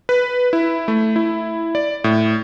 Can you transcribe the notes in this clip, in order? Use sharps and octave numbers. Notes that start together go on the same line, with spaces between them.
B4
E4
A3
E4
D5
A2